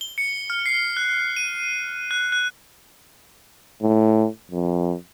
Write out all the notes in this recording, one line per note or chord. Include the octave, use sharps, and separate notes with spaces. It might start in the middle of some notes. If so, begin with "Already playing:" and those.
G7
C#7
F6
C7
F#6
D#7
F#6
F#6
A2
F2